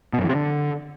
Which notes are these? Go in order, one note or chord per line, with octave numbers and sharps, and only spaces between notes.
B2
F#2
E3
C3
D3